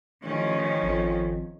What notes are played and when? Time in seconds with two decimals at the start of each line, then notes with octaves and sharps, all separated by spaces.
0.23 A1 D#3 F3 C#4
0.83 G#1 F2